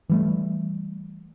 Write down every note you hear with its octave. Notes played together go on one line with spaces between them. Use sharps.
E3 G3 A3